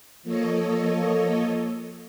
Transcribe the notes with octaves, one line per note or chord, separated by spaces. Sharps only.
F3 A#3 A4 C#5 D#5